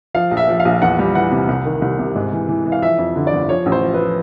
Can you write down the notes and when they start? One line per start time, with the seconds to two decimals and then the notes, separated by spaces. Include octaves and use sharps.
0.14 F3 F5
0.31 A#1
0.37 E5
0.49 F3
0.60 F5
0.65 A#1
0.82 E2 F#5
0.99 G3
1.15 E3 F#5
1.31 C3
1.49 C2
1.65 D#3
1.82 C2
1.99 C3
2.15 G#2
2.32 E3
2.49 E3
2.66 E3
2.72 F5
2.82 F3 E5
2.99 F2
3.15 D3
3.27 D5
3.33 G1
3.49 F3 C#5
3.66 A1
3.72 C5
3.83 F3
3.94 B4
3.99 F3